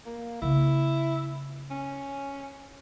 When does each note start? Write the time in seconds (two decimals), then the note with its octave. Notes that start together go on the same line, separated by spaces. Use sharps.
0.06 A#3
0.42 C#3 A#3 E4
1.71 C#4